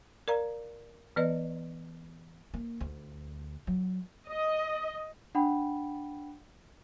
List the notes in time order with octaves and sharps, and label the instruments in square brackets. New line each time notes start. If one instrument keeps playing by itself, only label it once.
[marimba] A#4 D5 F5 A#5
E3 B3 B4 D5 D#5
[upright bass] A#3
D2
F#3
[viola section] D#5
[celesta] D4 F#5 G5 B5